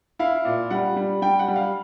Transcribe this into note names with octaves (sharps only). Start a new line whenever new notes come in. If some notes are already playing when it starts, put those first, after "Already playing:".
E4 F5
A#2
G3 F#5
G3
G3 G5
F#5
G3
F5